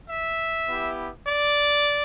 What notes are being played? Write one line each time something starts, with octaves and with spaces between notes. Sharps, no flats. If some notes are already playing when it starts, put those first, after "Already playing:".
E5
B3 E4 G4
D5